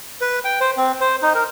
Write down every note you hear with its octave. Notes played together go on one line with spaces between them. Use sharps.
B4
G5
C5
C4
C5
D#4
A#4